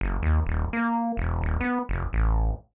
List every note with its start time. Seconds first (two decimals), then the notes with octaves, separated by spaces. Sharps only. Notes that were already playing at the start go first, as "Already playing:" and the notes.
0.01 F#1
0.23 D#2
0.47 D#1
0.73 A#3
1.17 E1
1.42 D#1
1.61 B3
1.89 F1
2.13 A1